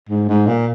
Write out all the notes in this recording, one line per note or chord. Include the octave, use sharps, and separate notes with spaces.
G#2
G#2
A#2